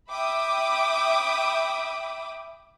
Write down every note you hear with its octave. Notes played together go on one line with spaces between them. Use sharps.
E5 G5 B5 D6 D#6